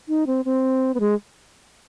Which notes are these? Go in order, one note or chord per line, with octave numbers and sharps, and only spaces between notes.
D#4
C4
C4
B3
G#3